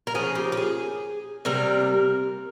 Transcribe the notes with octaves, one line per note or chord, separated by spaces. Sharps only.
A#4
C#3 F3 A#3 G#4
G4
G4
G#4
C3 G3 A#3 A#4